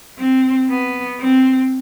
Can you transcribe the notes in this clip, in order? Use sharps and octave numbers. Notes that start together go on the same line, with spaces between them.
C4
B3
C4